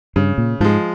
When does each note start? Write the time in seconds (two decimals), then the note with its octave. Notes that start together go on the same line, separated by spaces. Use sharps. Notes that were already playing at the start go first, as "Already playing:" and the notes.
0.16 G2 C#3
0.38 A#2
0.60 G#2 F3 G#3